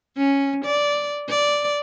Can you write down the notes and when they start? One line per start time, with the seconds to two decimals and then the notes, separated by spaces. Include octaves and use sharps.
0.17 C#4
0.65 D5
1.29 D5